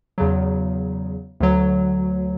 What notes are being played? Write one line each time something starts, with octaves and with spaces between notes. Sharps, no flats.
E2 C#3 F#3
D2 D3 F#3